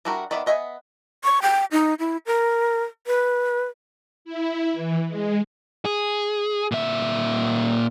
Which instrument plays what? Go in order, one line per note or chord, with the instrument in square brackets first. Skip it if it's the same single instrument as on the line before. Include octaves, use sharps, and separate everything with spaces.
[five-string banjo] G3 D4 E4 F#4 A#4
D#3 B3 D5 E5
B3 D#5 E5 G5 G#5
[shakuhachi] C#6
G5
D#4
E4
A#4
B4
[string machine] E4
E3
G#3
[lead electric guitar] G#4
A#2 E5